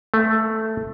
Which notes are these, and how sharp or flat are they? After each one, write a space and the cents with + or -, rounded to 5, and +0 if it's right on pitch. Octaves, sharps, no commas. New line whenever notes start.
A3 +5